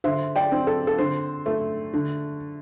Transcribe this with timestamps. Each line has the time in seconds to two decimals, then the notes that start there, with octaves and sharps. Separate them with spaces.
0.04 D3 C5 E5
0.36 D5 G5
0.52 C4
0.67 A4
0.87 A4
0.98 D3 C5
1.46 A3
1.94 D3